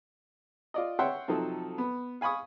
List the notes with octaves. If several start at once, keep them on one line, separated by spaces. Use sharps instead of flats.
F4 D5 D#5
C#5 E5 F#5 G5 C6 C#6
C3 F3 F#3 C4 D#4 A4
B3
F5 G#5 B5 C#6 D#6